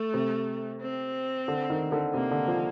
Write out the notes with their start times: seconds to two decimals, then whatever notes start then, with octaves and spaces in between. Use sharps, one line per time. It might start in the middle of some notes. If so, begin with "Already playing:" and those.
Already playing: A3
0.14 C3
0.81 C4
1.48 D3
1.70 D#3
1.92 D3
2.14 C3 A#3
2.31 D3
2.48 F3